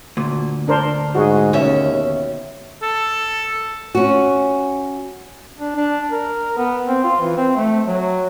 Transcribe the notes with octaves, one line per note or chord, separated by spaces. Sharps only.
D2 A#2
D4 A#4 C5
G#2 F#4 G#4
D#2 B2 C#4 E5
A4
C#4 F#4
D4
D4
A#4
B3
C4
F4
E3
C4
A3
F#3